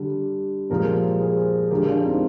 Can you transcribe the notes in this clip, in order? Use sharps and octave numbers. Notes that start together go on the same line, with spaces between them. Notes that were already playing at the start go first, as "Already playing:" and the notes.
Already playing: D3 G3
A#2 F3 G#3 G4 A#4
G#4 C5
D3 F3 G#3 G4 A#4
D4 F4
C4 D#4